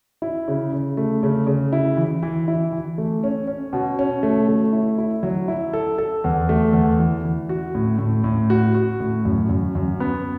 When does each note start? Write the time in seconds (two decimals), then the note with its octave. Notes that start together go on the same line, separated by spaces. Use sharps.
0.22 E4
0.48 C#3
0.72 C#3
0.97 A3
1.23 C#3
1.47 C#3
1.73 E4
1.97 E3
2.23 E3
2.48 E4
2.73 E3
2.98 A3
3.24 C#4
3.47 C#4
3.73 B2
3.99 C#4
4.23 A3
4.48 A3
4.73 E4
4.98 E4
5.23 F#3
5.48 E4
5.73 A4
5.98 A4
6.24 E2
6.49 A3
6.73 E2
6.99 E3
7.25 E3
7.49 F#4
7.75 A2
7.99 A2
8.24 A2
8.50 F#4
8.74 F#4
9.00 A2
9.25 F#2
9.49 F#2
9.75 F#2
10.00 B3